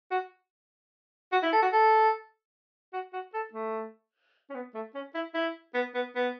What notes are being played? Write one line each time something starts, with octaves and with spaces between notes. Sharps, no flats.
F#4
F#4
E4
A4
F#4
A4
F#4
F#4
A4
A3
C#4
B3
A3
C#4
E4
E4
B3
B3
B3